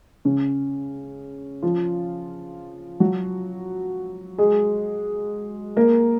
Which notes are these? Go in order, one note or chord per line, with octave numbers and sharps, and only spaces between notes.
C#3 C#4
F3 F4
F#3 F#4
G#3 G#4
A#3 A#4